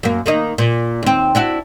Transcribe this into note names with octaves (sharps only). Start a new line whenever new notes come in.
F#2 A#3
D#3 A#3 D#4
A#2
D#2 C4
D4 E4 F#4